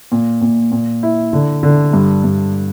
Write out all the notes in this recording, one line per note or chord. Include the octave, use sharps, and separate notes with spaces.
A#2
A#2
A#2
E4
D3
D3
G2
G2